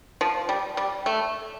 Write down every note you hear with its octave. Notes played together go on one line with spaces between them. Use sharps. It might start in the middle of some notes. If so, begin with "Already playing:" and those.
F3
G3
G3
A3